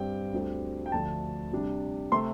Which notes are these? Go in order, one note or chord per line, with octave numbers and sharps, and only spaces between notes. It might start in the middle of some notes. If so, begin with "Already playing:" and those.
Already playing: G2 G3 C4 G5
D2 D3 G3 C4
G5
D2 D3 F3 A3 D4 A5
C3 G3 D4
C3 A3 C4 C6